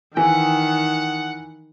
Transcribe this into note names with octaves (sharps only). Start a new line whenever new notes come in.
D#3 E3 F#5 G#5